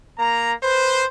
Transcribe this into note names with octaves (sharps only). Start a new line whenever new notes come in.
A#3 A#5
B4 C5